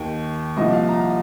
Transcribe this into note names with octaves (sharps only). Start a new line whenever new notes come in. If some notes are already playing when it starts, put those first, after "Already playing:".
Already playing: D#2 D#3 G5
C2 A#2 F3 D#5
F5
A#5